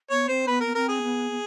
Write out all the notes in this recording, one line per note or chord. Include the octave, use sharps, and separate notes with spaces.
B3 C#5
C4 C5
B3 B4
B3 A#4
C4 A#4
G#4
B3
B3